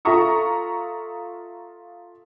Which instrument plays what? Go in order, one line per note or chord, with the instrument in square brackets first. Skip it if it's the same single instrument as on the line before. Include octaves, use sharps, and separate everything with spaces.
[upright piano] F4 A4 E5 A#5 C#6 D#6